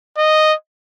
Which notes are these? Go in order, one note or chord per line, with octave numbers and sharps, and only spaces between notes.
D#5